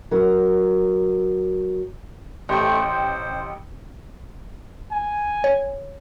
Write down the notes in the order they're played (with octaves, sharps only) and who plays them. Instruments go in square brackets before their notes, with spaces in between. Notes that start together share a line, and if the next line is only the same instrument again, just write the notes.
[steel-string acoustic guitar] F#3 A#4
[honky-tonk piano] A1 G4 G5 [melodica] A3 C5
[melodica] C5
[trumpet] G#5
[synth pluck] C#5